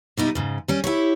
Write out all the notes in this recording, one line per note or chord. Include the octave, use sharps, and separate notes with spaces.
B2 G3 D#4 E4
G#2 C#3
G3 C#4
E4 G4 C#5